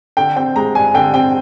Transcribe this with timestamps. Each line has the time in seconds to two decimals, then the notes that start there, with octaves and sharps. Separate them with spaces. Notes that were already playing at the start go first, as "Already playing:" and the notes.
0.17 D3 G5
0.36 C4 G5
0.56 G#3 A#5
0.75 G2 G#5
0.94 D3 G5
1.14 C4 G5